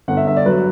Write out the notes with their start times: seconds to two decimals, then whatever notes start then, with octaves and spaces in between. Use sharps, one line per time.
0.08 G1 F#5
0.17 E5
0.27 G2 E5
0.37 D5
0.46 F#3 B4